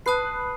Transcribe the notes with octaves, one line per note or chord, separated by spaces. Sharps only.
B4 A5 D#6 F#6 C7